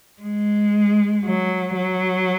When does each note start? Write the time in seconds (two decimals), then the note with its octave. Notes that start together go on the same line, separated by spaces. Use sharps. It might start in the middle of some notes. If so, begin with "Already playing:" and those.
0.22 G#3
1.25 F#3
1.76 F#3